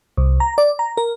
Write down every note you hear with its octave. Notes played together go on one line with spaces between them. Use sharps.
C2
A#5
D5
A#5
A#4